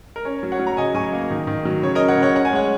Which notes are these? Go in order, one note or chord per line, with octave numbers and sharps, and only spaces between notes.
A#4
C#4 C#5
F#3
C#5 F#5
F#3
A#5
C#3 D#5 G#5
F#3 G#5 C#6
A#3
D#3
D#3
F#3
C#3 C#5
C#4 A#4 D#5
C#5 F#5
C#3
C#5 F#5
C#4 F#5
G#5
G#3 C#5 F#5